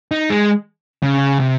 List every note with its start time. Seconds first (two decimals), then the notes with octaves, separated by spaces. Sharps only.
0.11 D#4
0.30 G#3
1.03 C#3
1.40 C3